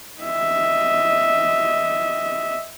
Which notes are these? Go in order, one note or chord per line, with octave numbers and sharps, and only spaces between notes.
D#5 E5